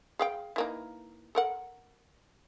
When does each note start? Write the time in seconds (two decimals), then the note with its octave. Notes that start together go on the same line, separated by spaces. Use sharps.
0.19 G#4 F5 G5
0.56 E3 A#3 D#4
1.35 A4 A#4 F#5